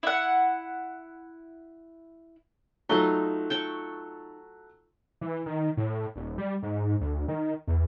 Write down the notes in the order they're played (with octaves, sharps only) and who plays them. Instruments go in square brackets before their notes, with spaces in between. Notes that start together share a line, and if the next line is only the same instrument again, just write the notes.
[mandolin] E4 F#5
[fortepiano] F#3 A3 [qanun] D#4 F4 C6
[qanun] G5 A5 C#6
[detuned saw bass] E3
D#3
A2
D#1
G3
G#2
D2
D#3
E2